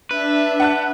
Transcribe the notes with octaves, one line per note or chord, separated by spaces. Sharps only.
D4 B4 E5
F#5 A5 F#6